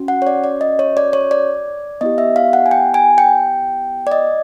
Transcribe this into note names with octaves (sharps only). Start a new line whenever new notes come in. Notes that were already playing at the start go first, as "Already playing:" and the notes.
Already playing: C#4 F#4
F#5
C#5
D5
D5
D#5
C#5
D5
C#5
D5
B3 E4 G4 D#5
E5
F5
F#5
G#5
G5
G#5
G5
D5
D#5